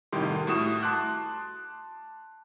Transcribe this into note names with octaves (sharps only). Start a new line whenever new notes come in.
C2 A2 D#3 G4 C6
A2 A3 F#4 D#6 E7
A5 C6 D6 F#6